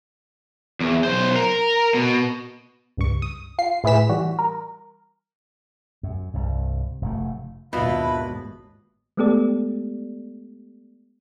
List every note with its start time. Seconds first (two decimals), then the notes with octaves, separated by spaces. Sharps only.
0.80 E2
1.04 B1 C5
1.36 A#4
1.94 B2
2.97 C#2 G2 C#6
3.22 D#6
3.59 F4 C7
3.84 A2 E4 G#4 B4 B6 E7
4.09 E3 G3 F#4
4.39 A#4
6.03 F#2
6.34 C2 G2
7.02 F1 F#2 A3
7.73 G#1 D#2 B2 D4 E4 F4 B4 B5
9.17 G#3 A3 B3 G4 A4 D5